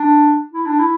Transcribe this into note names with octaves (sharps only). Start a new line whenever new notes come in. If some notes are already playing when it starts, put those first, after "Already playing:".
Already playing: D4
E4
D4
E4